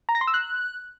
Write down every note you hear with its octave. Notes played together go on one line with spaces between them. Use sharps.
A#5
A#6
C6
E6
F#6